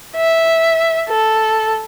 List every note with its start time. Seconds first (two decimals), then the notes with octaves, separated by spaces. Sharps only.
0.17 E5
1.09 A4